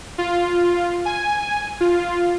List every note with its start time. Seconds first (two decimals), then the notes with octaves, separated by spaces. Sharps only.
0.18 F4
1.05 G#5
1.81 F4